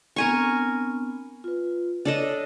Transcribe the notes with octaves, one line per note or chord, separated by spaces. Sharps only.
B3 C4 D4 A#4 G#5 C#6
F4 B4
D4 A4 C#5 D#5